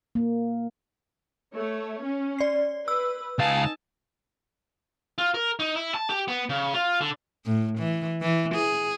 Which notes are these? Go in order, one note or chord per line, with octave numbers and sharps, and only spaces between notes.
A#3
A3 C#5
C#4
D5 C7
B4 E6
C#2 D#4 F5 G#5 A5
F4
A#4
D#4
E4
A5
G4
B3
C#3
F4
D3
A2
E3
E3
G#4